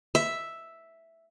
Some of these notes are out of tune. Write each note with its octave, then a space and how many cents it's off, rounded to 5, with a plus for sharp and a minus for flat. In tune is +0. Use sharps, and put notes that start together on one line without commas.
E5 +0